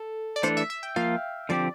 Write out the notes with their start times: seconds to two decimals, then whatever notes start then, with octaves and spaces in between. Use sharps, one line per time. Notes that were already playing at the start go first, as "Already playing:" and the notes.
Already playing: A4
0.36 D5
0.43 E3 A3 D4 A4 C5
0.57 E5
0.70 E5
0.83 G5
0.96 F3 A#3 F4 F5
1.49 D3 F3 C4 G4 D5